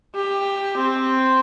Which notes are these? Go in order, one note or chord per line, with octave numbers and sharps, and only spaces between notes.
G4
C4